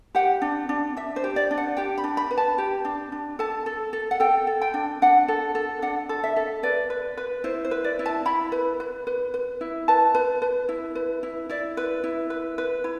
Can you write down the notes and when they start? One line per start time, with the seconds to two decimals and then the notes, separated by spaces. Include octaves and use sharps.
0.15 G4 F#5
0.42 D4
0.69 D4
0.97 D4 E5
1.16 C5
1.24 G4
1.36 D5
1.51 D4
1.57 F#5
1.77 G4 G5
1.98 B5
2.04 D4
2.17 B5
2.31 B4
2.37 A5
2.58 G4
2.85 D4
3.12 D4
3.39 A4 A5
3.66 A4
3.93 A4
4.11 F#5
4.20 A4 G5
4.47 A4
4.61 G5
4.74 D4
5.02 D4 F#5
5.28 A4
5.55 A4
5.82 D4 F#5
6.09 A4
6.24 E5
6.36 A4
6.63 B4 D5
6.90 B4
7.17 B4
7.44 E4 C5
7.65 C5
7.71 B4
7.84 D5
7.99 E4
8.06 A5
8.25 E4 B5
8.52 B4
8.80 B4
9.07 B4
9.34 B4
9.61 E4
9.88 B4 A5
10.15 B4
10.42 B4
10.69 E4
10.95 B4
11.23 E4
11.49 E4 D5
11.77 B4
12.04 E4
12.30 B4
12.58 B4
12.84 E4